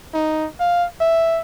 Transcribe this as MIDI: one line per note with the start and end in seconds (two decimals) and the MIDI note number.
0.14 0.47 63
0.60 0.85 77
1.01 1.41 76